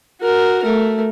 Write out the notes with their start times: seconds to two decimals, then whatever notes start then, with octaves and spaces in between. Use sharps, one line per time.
0.21 F#4 A#4
0.62 A3 A#4